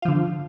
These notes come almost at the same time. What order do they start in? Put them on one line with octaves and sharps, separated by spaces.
F4 F3 D3